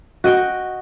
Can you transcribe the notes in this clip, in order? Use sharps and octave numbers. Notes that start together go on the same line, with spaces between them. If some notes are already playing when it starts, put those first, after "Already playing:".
F#4 D#5 G5